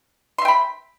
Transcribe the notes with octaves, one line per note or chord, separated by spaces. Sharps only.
E5 G5 B5 C6